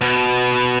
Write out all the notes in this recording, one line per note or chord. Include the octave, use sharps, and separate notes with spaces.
B2